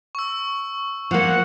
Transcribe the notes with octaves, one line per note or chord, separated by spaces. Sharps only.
C#6 E6
F3 A#3 F#5